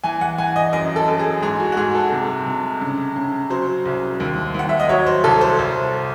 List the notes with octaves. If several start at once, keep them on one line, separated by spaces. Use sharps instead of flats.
E3 G#5
F#5
E3 G#5
D#5
F#2 D#5
A4
F#2
G#4
G#2 G#4
F#4
F#4
G#2 G#4
A4
C3
C3
C#3
C#3
F#3 C5
C2
D#2
D#2 F#5
E5
D#5
F#3 C#5
C5
C2 A4
C5
C2